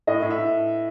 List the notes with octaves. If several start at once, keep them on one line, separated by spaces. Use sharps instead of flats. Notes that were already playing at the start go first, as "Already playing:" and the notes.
A2 D#5
A2
E5
A2